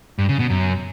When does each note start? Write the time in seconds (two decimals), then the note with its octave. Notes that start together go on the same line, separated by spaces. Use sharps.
0.18 G2
0.29 C#3
0.39 B2
0.50 F#2